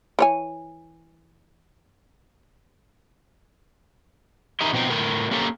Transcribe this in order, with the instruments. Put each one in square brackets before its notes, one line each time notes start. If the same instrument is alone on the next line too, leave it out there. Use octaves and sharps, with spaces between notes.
[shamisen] E3 C#5 G#5
[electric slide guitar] D#4 E4 G4 A#4 D#5
B2 F3 C4 D#4 G5
A2 A#4 G5
A#3 C#4 G4 A4 A#4